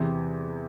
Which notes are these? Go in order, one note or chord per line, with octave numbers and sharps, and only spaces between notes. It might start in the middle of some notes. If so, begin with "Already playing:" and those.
Already playing: E2 C3 E3 G5